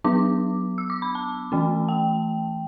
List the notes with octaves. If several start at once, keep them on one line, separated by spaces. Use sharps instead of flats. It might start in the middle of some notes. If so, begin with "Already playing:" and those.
F#3 B3 D4 D6
E6
D6
B5
A5
E3 A3 C#4
G5